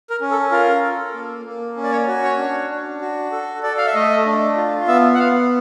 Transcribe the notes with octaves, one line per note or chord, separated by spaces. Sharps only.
A#4
C#4
A4
F4 A#4
A4
A#3
A#3
C#4
D5
C#5
F#4
C#5
D4
D4
F#4
A4
A4 D5
F5
E5
A3 D#5
D4
F4
B3 E5
F#5
B3 F5